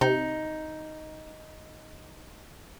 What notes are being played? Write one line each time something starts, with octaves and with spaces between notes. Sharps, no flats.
C3 D#4